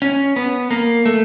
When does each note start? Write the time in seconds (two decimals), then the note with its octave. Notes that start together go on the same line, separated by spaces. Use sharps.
0.02 C#4
0.36 B3
0.71 A#3
1.06 A3